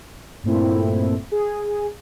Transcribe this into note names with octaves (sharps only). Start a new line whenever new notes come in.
G2 A#2 A3 C4 E4
G#4